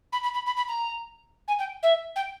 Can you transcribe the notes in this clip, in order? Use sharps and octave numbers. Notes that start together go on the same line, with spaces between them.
B5
B5
B5
B5
B5
A#5
G#5
G5
E5
G5